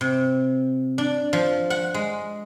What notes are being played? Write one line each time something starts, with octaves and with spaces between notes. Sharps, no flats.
C3
D4
F3
F#5
G#3